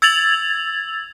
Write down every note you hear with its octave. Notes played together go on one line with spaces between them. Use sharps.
E6 G#6 A6 F7 F#7